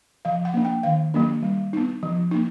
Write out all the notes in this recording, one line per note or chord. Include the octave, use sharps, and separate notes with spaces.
F3 F5
F#5
A#3 D4
G5
D#3 F5
F#3 A#3 D4
G3
B3 D#4
F3
A#3 D#4